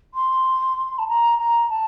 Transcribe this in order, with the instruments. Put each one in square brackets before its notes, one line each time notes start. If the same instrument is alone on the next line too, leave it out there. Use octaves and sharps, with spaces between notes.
[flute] C6
A5
A#5
A#5
A5